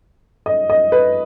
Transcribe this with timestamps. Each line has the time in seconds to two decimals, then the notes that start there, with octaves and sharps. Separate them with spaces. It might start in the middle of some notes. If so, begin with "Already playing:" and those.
0.46 D#5
0.70 D#5
0.92 B4